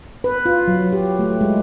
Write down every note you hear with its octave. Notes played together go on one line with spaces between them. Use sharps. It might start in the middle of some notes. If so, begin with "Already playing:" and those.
B4
F4
F#3
G4
A3
G#3